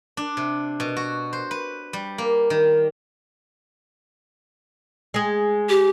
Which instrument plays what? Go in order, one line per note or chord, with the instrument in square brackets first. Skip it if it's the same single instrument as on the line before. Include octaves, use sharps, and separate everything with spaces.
[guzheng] D4
C3
B2
F#4
C5
B4
G3
A#3
D#3
[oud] G#3 G#4
[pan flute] G4